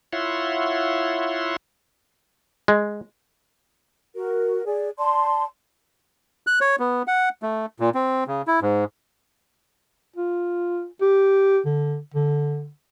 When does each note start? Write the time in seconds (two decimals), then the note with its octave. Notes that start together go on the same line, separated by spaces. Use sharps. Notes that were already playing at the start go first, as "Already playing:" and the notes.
0.13 E4 F4 C#5 E5 F#5 C6
2.68 G#3
4.15 F#4 A#4
4.65 G#4 D5
4.98 D5 A5 C6
6.47 F#6
6.61 C#5
6.79 B3
7.07 F#5
7.42 A3
7.80 A#2
7.95 C4
8.27 C#3
8.47 E4
8.62 G#2
10.16 F4
11.01 G4
11.65 D3
12.14 D3